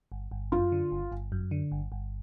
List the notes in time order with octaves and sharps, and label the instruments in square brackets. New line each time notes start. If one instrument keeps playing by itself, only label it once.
[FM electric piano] G1
G1
[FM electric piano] F#2 [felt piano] F4
[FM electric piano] D3
G1
G1
F#2
D3
G1
G1